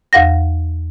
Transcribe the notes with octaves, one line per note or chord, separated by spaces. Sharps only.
E2 F5 F#5 A#6